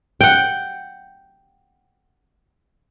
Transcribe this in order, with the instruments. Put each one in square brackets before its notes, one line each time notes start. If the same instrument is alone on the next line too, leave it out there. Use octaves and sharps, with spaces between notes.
[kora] F#5 G5